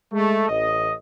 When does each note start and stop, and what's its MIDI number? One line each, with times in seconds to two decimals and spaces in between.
0.13 0.48 56
0.13 0.48 57
0.49 0.93 33
0.49 0.93 75